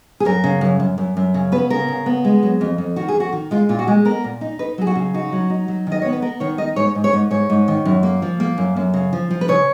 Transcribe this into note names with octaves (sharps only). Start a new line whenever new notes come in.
G#4
F#2 A#4
C#3
F#2
F#2
F#2
F#2
C#3
B3 B4
C#3 A#4
C#3
B3
G#3
F#3
F2
F2
D#3 F#4
G#4
F2
F#4
D#3
G#3 F4
A#2 F4
F#4
G#3 G#4
B3 A#4
A#2
D#4
D#4 B4
F#3 G#4
F#4
C#3
D#4 F#4
F#3
D#4
F#3
D#3 D#5
B3 C#5
B4
B3 A#4
D#3 C#5
D#4 D#5
G#2 C#5
G#2
C#5
G#2
G#2 C#5
G#2
D#3
F#2
A#3
F3
A#3
F#2
F#2
C#3
F3
F3
B4
C#3 C#5